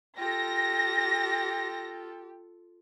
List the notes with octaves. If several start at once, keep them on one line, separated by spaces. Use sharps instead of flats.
F4 G4 A4 A#6